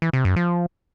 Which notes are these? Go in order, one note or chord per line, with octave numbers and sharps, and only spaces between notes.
E3
C3
F#2
F3